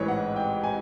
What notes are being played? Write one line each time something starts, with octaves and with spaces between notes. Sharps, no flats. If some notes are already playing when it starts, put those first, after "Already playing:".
Already playing: A1 G#2 E3 G#3 B4 C#5
F#5
G5
G#5